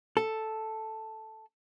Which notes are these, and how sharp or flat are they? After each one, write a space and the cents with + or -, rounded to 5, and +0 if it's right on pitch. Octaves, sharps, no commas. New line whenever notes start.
A4 +0